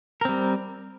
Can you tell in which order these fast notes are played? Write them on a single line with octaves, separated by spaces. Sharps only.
A#4 C4 G3